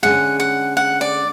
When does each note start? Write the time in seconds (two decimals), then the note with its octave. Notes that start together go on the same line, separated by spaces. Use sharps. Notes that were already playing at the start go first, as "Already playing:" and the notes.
0.03 D3 G#3 C#4 G#4 F#5
0.40 F#5
0.77 F#5
1.01 D5